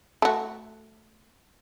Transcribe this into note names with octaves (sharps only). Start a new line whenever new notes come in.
A3 F#4